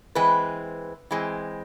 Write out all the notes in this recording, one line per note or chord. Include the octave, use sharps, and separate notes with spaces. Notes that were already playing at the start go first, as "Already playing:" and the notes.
E3 G#3 C4 B4
E3 G#3 C4